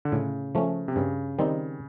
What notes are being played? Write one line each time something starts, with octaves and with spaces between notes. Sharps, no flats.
D3
A2 C#3
F3 A3 C#4
C3
G2 C#3
D#3 G3 C4 D#4